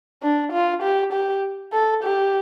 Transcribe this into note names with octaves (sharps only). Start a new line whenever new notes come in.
D4
F4
G4
G4
A4
G4